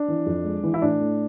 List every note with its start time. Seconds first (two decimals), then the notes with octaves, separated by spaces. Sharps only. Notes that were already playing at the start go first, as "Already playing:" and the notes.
Already playing: D4
0.08 E3
0.26 F2
0.45 G#3
0.63 E3
0.74 E4
0.82 A2 D4
1.00 A3